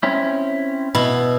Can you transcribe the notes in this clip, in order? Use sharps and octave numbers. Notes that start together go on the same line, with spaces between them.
C4 C#4 E4
B2 E4